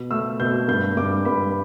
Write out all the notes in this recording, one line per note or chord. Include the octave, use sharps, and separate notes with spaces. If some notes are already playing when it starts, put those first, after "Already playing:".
Already playing: B2
A3 E6
B2 G6
G2 G6
G2 D6
G2 B5